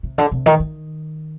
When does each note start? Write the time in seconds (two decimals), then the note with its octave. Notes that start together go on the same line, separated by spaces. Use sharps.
0.03 C3
0.18 D3
0.32 C3
0.46 D#3
0.60 D#3